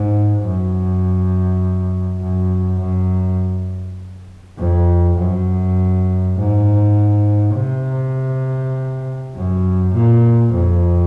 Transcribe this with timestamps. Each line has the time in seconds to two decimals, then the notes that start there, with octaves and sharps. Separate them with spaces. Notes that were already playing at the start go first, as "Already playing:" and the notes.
Already playing: G#2
0.42 F#2
2.21 F#2
2.80 F#2
4.59 F2
5.18 F#2
6.37 G#2
7.56 C3
9.34 F#2
9.94 A#2
10.53 F2